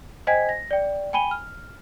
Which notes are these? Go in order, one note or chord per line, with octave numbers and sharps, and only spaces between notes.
C5 D#5 G5 G#5 G#6 B6
A#6
D5 G5
G5 G#5 B5 D#7 G7
F6